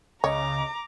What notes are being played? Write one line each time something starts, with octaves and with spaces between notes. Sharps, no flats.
C#2 C#3 C#5 D#5 A#5 D6